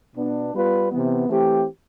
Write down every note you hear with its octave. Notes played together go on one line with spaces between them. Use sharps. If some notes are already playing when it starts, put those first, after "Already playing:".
B2 B3 D4
G3 B3 F4 B4
C3 E3 B3
E3 A3 C4 G4